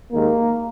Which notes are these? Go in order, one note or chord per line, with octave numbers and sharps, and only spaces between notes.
D#2 D#3 G#3 A#3